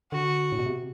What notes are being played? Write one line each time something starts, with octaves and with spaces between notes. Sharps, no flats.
D3 F#4
A2
B2
C3